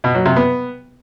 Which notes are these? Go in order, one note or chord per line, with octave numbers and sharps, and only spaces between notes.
B2
F#3
C3
B3